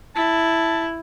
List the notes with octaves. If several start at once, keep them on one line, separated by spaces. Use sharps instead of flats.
E4 A5